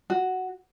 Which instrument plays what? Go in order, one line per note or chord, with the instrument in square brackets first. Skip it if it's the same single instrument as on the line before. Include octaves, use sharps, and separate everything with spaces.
[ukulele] F#4